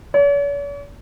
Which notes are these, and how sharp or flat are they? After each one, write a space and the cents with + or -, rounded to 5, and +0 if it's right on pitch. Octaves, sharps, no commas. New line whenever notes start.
C#5 +45